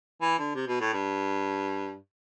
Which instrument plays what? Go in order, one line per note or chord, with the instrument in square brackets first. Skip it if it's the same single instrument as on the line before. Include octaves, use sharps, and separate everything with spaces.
[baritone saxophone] E3
D3
C3
B2
A2
G2